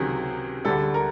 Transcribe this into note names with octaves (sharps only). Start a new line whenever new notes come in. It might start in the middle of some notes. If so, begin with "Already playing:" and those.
Already playing: C#2 C3 D#3 F#3 G#4
D2 D3 G3 A4
A#4